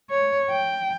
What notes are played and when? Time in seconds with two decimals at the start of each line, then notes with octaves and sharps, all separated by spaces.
0.10 C#5
0.51 G5